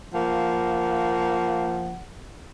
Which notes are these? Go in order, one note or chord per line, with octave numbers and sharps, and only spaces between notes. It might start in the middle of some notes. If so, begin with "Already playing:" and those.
F3 A#3 F#5